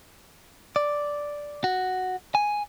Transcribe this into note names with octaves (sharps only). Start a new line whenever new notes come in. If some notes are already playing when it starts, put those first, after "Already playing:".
D5
F#4
G#5